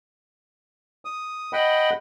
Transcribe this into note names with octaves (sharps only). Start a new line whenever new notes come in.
D#6
D#5 F#5 G5 B5